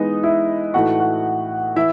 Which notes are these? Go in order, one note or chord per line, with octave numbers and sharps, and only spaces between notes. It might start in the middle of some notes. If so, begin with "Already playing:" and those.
Already playing: E3 G#3 B3 D#4 D#5
E4 E5
A2 E3 A3 D#4 F#4 F#5
F#4 F#5
E3 E4 E5